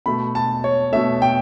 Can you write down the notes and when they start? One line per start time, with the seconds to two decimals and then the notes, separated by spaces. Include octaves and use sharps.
0.06 B2 A3 B5
0.35 A5
0.64 C#5
0.93 B2 A3 E5
1.22 G5